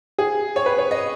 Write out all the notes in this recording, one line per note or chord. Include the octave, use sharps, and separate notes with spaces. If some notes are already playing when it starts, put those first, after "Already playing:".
G#4
C#5
B4
C#5
D#5